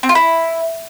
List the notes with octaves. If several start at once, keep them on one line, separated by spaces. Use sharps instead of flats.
C4
F4
E4